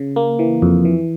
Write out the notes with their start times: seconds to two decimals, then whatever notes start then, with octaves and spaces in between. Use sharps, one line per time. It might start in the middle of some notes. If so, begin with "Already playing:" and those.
Already playing: C#3
0.16 A#3
0.39 E3
0.62 F2
0.85 E3